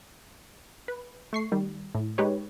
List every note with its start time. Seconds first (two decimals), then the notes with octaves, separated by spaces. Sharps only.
0.88 B4
1.33 A3 C#6 C7
1.52 D#3 G3
1.95 A2
2.18 G#3 D#4 G4 B4 C#5